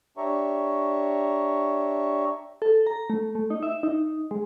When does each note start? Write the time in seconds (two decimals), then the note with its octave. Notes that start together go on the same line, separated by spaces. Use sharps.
0.17 D4 G4 C#5 E5 A#5 C#6
2.62 A4
2.87 A#5
3.10 A3
3.35 A3
3.50 D#4
3.63 E5
3.83 D#4
4.31 G#3